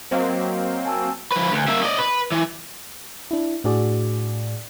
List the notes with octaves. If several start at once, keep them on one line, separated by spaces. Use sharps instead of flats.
F#3 A#3 C4 C5 D#5 F5
G#5 A5 E6
F3 B4
D2
A#3 E5
D5 D#5
B4
E3
D4 E4
A2 D4 F#4 G#4 D5